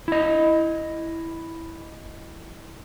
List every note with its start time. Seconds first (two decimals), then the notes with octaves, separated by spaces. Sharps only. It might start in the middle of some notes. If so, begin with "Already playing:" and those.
0.08 E4 D#5